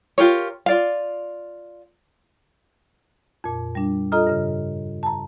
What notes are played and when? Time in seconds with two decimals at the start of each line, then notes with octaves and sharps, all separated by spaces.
0.18 F4 G4 A#4 C#5
0.66 F4 D5 F5
3.44 F2 A#2
3.75 G3 D4
4.12 F4 A4 D#5 A#5 D#6 F6
4.27 G2 C#3
5.03 A5 A#5